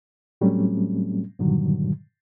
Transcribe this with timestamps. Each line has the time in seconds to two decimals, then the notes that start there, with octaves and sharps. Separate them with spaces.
0.41 A2 F#3 G3 A3 C4 C#4
1.39 G2 A#2 D3 D#3 F#3 G3